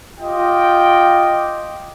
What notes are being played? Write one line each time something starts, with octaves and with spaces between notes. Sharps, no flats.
F4 G4 D#5 G5